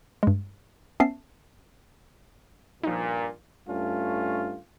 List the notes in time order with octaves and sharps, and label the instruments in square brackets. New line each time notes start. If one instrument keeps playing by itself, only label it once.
[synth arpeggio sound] G2 G#3
B3 C#4 E5 A5 C7
[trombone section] G2 A#2 [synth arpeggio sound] F3 D#4
[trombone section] G2 A3 C#4 F4